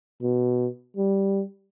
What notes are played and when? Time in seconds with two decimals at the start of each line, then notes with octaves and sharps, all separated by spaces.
0.22 B2
0.97 G3